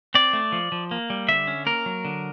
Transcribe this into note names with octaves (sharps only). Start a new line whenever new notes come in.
C4 D5
A3
F3
F3
A#3
G3
D3 E5
C#4
A#3 A#4
F#3
D3